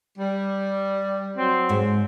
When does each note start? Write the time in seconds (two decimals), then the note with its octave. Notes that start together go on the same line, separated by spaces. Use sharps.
0.18 G3
1.37 F#3 C4
1.69 G#2